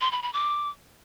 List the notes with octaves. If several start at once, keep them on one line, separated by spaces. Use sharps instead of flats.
C6
B5
B5
D6